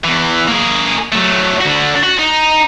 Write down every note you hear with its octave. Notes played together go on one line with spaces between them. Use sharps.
E2 E3
A#3 G#4
F#3 A3
D3 F#4
F#4
D#4